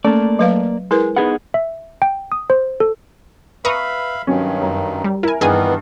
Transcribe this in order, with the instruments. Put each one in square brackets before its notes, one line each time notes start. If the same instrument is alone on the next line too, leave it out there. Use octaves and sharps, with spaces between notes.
[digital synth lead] A3 [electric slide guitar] A#3 D5 [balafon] C#4
[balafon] F#3 B4 F5
[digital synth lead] G#3 [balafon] E4 A#4 B4
[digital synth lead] B3 [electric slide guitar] D#4 G#4 F#5
[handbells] E5
G5
D#6
C5
A4
[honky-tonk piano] B4 [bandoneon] E5 F5 B5 [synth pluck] A#5 C#6 D#6
[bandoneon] G2 D#3 [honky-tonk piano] F#3 C#4
[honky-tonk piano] F#2
[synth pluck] G3
[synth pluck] E4 G#5 [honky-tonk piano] A#4
[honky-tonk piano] G2 [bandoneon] D#3 E3 B3 [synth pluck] G#4 D#5 G#5